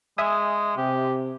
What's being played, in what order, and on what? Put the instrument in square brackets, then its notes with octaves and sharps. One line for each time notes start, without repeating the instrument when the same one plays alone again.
[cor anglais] G#3 [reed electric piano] E5 G#5 D#6
[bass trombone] C3 [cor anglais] G4